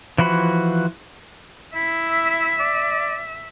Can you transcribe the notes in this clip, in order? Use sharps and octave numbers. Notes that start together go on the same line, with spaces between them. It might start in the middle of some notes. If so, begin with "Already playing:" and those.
E3 F3 F#4 B5
E4 E5
D5